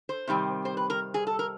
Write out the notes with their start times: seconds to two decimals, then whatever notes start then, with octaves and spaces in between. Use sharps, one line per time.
0.09 C5
0.27 C3 D#3 G3 C4
0.65 C5
0.77 B4
0.90 A#4
1.14 G#4
1.27 A4
1.39 A#4